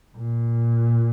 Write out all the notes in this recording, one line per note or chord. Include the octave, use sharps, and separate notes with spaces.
A#2